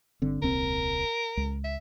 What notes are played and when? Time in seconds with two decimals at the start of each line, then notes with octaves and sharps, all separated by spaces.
0.22 G1 D3 C4
0.42 D#1 C2 C4 A#4
1.37 C#2
1.64 E5